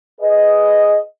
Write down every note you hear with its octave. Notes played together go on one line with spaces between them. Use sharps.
G#4 B4 D#5